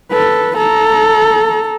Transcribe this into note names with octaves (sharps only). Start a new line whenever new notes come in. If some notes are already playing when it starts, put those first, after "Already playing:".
A4 B4
A4 A#5